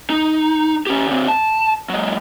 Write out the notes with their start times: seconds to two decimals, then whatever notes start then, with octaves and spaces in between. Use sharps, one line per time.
0.10 D#4
0.87 C#4 G4
1.06 D3 C4
1.28 A5
1.89 F#3 G#3